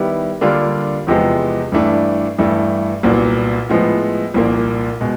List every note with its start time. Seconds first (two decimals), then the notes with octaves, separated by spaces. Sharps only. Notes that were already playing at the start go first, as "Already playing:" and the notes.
Already playing: D#3 G3 B3 E4 G4
0.41 D3 G3 A#3 D4 F4
1.07 E2 C3 F3 G#3 B3
1.72 G2 E3 A3 D4
2.39 G2 E3 A3
3.03 C2 A#2 F#3 B3
3.69 A2 F3 G#3 B3
4.34 C2 A#2 F3 A#3
5.01 B2 G#3